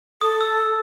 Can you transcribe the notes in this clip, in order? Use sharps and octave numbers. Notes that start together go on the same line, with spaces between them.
A4 D#6
E6